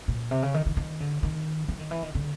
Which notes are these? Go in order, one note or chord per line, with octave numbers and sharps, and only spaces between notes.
A#2
C3
C#3
D#3
D#3
D#3
D3
D#3
E3
D#3
E3
D#3
D3